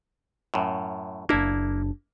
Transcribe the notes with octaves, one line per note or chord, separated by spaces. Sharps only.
F#2 A2
F#1 A#3 D4 E4